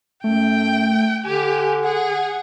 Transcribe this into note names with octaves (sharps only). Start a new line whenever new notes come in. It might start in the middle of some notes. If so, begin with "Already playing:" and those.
F#2 A3 G5
D3 G4 G#5
G#4 F#5